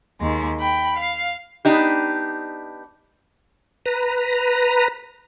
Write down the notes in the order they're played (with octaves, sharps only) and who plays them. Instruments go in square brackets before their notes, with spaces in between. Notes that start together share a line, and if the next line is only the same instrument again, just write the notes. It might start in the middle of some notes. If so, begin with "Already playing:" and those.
[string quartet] D#2 G#3
G5 B5
F5
[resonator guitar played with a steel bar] B3 D4 D#4 G4
[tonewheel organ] B4 A#5